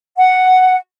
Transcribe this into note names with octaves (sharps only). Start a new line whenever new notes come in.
F#5